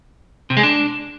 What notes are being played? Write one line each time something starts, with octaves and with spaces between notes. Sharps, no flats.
C3
G#3
D4